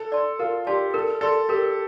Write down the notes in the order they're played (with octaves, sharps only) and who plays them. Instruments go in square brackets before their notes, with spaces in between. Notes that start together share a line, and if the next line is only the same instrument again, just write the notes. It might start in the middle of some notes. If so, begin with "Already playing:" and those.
Already playing: [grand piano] A4
[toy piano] D5 A5 C6
[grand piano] F4 [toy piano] A#4
[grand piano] G4 [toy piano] D5 A5 C6
[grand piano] A4 [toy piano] A#4
[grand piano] A4 [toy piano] D5 A5 C6
[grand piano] G4 [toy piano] A#4